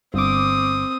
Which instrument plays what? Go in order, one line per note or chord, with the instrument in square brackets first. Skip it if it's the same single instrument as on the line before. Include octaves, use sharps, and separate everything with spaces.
[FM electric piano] G1 D6 [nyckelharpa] C4 D#6